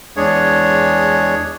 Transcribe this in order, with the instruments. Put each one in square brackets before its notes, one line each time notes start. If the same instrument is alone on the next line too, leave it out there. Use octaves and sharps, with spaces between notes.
[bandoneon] E2 G#3 D4 G#4 C#5